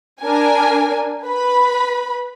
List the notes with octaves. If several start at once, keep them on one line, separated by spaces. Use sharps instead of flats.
D4 A#4 G#5
B4 B5